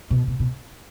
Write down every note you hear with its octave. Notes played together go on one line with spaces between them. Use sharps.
B2
B2
B2